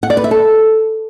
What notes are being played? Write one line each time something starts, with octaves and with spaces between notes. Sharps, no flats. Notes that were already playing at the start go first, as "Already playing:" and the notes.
F#5
D5
B4
E5
A4